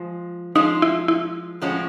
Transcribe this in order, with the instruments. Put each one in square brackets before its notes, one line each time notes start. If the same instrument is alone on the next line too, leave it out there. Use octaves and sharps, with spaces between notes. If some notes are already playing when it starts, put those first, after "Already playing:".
Already playing: [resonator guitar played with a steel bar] F3 G#3
[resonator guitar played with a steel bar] F3 G#3 C#4 F4 [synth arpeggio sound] D#4
[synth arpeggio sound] E4
E4
[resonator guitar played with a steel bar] A2 F3 G#3 C#4 F#4